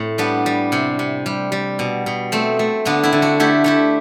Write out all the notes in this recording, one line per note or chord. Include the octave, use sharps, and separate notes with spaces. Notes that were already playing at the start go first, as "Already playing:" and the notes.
Already playing: A2 C4
G3 B3 D4
G3
C3 C4
C3
G3
G3
B2
B2
A3 C4
A3
D3 B3 D4
C4 E4
D3
D4 F#4
A3 E4 G4
A3 E4 G4